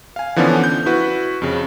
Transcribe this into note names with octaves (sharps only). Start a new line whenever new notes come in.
F5 G#5
D3 E3 F3 B3 C#4 D4
G6
E4 F#4 B4
F2 C#3